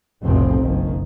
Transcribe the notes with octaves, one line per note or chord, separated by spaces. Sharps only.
F1 B1 A2 C4
F#1 D#3